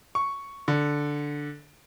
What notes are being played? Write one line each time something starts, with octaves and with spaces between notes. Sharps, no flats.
C#6
D3